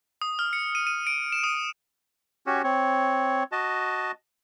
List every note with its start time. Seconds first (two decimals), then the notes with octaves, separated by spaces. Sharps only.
0.22 D#6
0.39 F6
0.53 C#7
0.75 D#7
0.87 D#7
1.07 D7
1.32 E7
1.44 D#6
2.47 C#4 F#4 G4 C#5
2.64 C4 C#5
3.52 F#4 D#5 A5